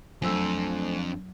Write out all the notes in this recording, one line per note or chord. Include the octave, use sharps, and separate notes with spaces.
F2 F#3 A3 D4 C5 G#5 E6